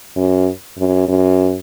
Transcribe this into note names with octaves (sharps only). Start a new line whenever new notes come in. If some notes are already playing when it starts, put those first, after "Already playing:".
F#2
F#2
F#2